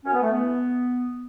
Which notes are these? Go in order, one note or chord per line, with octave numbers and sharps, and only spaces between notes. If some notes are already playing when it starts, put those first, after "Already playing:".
F#2 C#4
B3
A3
B3
E3